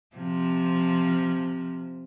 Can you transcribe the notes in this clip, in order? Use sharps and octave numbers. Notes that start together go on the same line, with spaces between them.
C3 F3